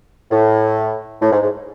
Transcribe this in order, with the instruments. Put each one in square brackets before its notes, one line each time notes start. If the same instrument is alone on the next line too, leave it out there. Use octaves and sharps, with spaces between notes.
[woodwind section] A2
A2
G#2
G#2